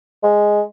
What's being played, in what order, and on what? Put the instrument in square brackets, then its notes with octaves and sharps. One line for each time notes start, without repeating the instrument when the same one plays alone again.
[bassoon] G#3